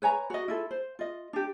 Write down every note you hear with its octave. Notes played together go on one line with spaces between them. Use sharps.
B4 C#5 G#5 A#5
F#4 D#5
E4 F4 A4
C5
F4 D#5
D4 G4